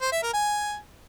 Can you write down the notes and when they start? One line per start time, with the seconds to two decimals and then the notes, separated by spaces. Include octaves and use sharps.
0.01 C5
0.12 E5
0.23 A#4
0.33 G#5